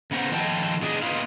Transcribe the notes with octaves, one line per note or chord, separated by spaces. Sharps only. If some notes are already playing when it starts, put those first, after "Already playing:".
C#3 B3 A#4 C5 F#5
D#3 F3 D#5 G5 A5
B2 D4 G#4 D#5
B3 D#4 F4 B4 F5